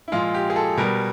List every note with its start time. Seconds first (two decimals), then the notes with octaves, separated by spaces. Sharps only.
0.08 E4
0.12 A#2 F3 G#3 F4
0.34 G4
0.50 G#4
0.56 A4
0.77 B2 G3 A#4